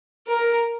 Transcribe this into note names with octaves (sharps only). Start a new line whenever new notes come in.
A#4